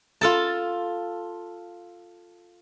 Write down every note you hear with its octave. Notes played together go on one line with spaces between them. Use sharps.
F4 A4 A5